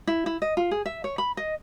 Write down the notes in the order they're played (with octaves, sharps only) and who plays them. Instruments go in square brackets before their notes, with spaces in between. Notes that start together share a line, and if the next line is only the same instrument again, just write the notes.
[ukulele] E4
E4
D#5
F4
G#4
E5
C#5
B5
D#5